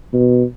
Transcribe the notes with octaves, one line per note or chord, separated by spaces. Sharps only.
B2